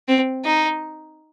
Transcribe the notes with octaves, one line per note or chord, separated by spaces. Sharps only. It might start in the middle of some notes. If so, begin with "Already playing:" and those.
C4
D#4